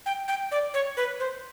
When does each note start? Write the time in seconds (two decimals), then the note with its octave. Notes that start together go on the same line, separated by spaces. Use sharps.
0.06 G5
0.28 G5
0.51 D5
0.74 C#5
0.97 B4
1.20 C5